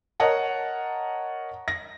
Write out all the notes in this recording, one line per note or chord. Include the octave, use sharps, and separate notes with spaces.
A#4 C#5 D#5 F#5 A5
A#6